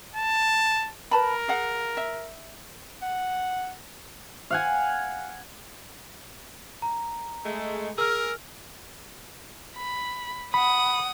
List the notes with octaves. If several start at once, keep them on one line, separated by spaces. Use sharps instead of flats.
A5
A#4 B4 A5 B5
G#4 F5 F#5
E5
F#5
F5 F#5 G#5
A#5
G#3 A3
G#4 A#4 E6 F6
B5
F#5 B5 D#6